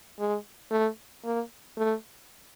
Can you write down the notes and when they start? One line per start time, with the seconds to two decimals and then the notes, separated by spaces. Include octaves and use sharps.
0.19 G#3
0.71 A3
1.24 A#3
1.77 A3